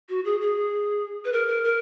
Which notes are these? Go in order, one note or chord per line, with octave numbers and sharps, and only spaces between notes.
F#4
G#4
G#4
B4
A#4
A#4
A#4